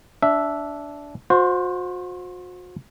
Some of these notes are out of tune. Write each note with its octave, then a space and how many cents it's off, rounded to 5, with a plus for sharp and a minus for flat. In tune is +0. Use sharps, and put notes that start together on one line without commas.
D4 -15 E5 +0
F#4 -40 C5 +0